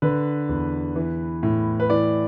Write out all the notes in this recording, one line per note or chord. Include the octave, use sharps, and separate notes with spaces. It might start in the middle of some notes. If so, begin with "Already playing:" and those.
D3 B4
E2
E3
A2
B4
E3 D5